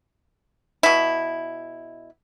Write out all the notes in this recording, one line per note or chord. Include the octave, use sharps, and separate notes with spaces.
B2 E4